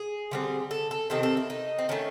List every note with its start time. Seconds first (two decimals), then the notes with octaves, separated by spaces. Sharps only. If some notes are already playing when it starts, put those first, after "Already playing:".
Already playing: G#4
0.31 D3 G3 C4
0.71 A4
0.91 A4
1.10 C3 D#3 C4 A4
1.23 A4
1.37 E4
1.50 D#4
1.79 C4
1.89 D#3 F#3 A3 C#4